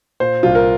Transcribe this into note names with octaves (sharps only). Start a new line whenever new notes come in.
A#2 C5
C2 F4
A#4